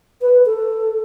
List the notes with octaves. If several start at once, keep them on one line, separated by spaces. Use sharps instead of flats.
B4
A4